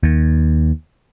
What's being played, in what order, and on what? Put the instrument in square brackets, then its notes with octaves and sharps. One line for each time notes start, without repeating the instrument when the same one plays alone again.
[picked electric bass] D#2